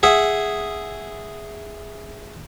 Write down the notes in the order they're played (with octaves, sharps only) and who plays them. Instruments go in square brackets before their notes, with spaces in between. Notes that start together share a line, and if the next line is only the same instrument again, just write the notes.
[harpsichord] G#4 E5 F#5